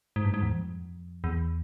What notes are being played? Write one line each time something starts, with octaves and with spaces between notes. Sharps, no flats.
G#2
G2
G#2
E2
F2
E2